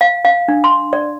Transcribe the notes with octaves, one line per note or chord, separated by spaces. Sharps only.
F5
F5
D4
C6
D5